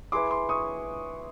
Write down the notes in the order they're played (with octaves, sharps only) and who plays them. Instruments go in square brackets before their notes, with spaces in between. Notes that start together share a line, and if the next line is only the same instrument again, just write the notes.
[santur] E4 G#4 B4 E5 [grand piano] C6 D6
[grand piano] C6 D6
C#6 D#6